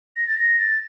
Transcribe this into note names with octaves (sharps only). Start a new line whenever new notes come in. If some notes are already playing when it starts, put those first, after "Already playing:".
A#6
A6
A#6
A6